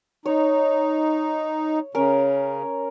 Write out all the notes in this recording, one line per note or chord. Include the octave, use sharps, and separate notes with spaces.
D#4 C#5
C#3 C#4 A#4